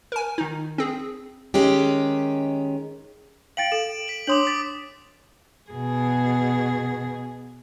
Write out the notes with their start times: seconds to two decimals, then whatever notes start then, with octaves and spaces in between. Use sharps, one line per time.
0.12 A#4 G#5
0.38 D#3 D#4
0.78 C4 G#4
1.54 D#3 G#3 C#4 G4
3.57 F5 G5 A6 D7 F#7
3.72 A4 E7
4.08 B6 F#7
4.27 D4 C#5 C6 D6 D#6 F#7
4.47 A6 B6 D7
5.71 B2 G#4